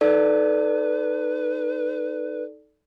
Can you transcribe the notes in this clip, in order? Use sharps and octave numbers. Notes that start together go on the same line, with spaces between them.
D#4 A4 B4 D5